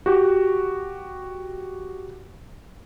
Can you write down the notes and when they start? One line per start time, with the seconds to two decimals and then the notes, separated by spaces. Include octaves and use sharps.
0.06 F#4 G4